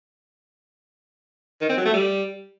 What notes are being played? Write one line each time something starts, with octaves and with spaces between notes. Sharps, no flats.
D#3
C4
F#3
A3
G3